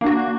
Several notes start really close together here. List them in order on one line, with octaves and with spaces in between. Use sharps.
A#3 D4 F#4